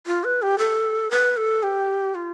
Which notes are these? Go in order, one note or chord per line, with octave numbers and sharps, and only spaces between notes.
F4
B4
G4
A4
B4
A4
G4
F4